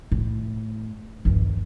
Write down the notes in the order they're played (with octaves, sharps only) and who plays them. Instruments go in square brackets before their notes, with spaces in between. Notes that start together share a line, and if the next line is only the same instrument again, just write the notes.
[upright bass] A2
G1 D#2